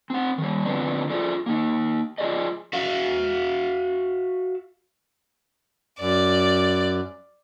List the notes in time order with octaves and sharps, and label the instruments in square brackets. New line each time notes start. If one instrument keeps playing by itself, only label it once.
[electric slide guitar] C4 F#5
D#3 G3
A2 D3 F3 B3 C4 D4
F4 G#4 A4 D5
A#3 D#4
F4 G#4 D5 D#5
F#4 E5 F5
[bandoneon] F#2 [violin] D5